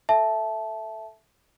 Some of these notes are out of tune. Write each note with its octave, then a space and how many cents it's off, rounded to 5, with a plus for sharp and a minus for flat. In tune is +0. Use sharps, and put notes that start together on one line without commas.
A4 +0 E5 +0 A5 -15